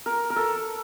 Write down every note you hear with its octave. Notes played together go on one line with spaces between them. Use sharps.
A#4
A#4
A4